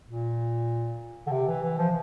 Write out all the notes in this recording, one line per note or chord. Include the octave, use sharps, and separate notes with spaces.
A#2
D3
C3
E3
E3
F3